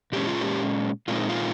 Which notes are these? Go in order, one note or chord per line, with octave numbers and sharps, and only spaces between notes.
A#2 G#3 C#4 G4
F4
G4
A#2 G#3 C4 D#4 F4
F4